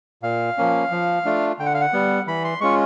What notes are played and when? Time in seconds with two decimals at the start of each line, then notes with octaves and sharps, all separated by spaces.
0.23 A#2 F5
0.58 F3 A#3 C#4
0.92 F3
1.25 A3 D4 F4
1.59 D3 G5
1.66 F#5
1.74 F5
1.81 F#5
1.93 G3 B3
2.27 E3 B5
2.44 C6
2.61 G#3 C#4 F4 C#6